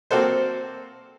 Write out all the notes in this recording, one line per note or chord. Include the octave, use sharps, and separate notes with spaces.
A#3 C4 F#4 A4 C5